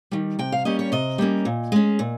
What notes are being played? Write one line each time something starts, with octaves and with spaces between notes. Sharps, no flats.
D#3 G3
C3 G5
F5
G3 A#3 C#4 D#5
C#5
C3 D#5
G3 A#3 C#4
A#2
G#3 C#4
A#2